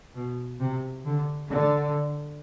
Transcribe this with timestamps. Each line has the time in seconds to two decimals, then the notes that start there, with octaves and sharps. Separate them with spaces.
0.15 B2
0.60 C3
1.05 D3
1.49 D3